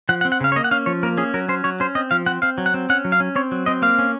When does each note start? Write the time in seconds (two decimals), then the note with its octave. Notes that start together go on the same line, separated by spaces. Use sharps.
0.09 F3 F#5
0.21 F#5
0.25 C4
0.32 F#5
0.40 C#3 F5
0.52 C#5
0.56 A#3 D#5
0.64 F#5
0.71 C#4 F5
0.86 F3 C#5
1.03 A#3 A#4
1.17 C#4 G#4
1.34 F#3 A#4
1.49 C#4 C5
1.64 F#3 C#5
1.80 C#4 C5
1.95 C4 D#5
2.11 F3 F5
2.26 C4 F#5
2.42 C4 F5
2.58 F#3
2.66 F#5
2.74 C4
2.90 C#4 F#5
3.05 F#3
3.12 F5
3.20 C#4
3.36 C4 C#5
3.51 F#3
3.66 C4 D#5
3.82 A#3 F5
3.99 C#4